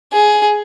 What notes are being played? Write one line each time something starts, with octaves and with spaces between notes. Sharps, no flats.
G#4